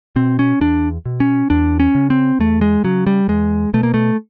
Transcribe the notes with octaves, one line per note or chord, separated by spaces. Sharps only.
B2 C4
C#4
E2 D4
B2
C#4
E2 D4
C#4
C#3
C4
E2 A3
G#3
C#3 F#3
G3
E2 G#3
B2 A3
A#3
A3